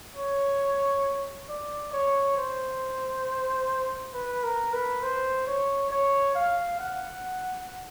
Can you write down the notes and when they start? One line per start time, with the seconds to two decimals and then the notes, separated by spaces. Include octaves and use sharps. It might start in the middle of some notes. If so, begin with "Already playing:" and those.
0.16 C#5
1.49 D5
1.93 C#5
2.37 C5
4.13 B4
4.43 A#4
4.73 B4
5.02 C5
5.46 C#5
5.90 C#5
6.35 F5
6.79 F#5